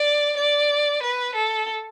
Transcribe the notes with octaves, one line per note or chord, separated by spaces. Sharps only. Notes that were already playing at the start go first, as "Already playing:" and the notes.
Already playing: D5
D5
B4
A4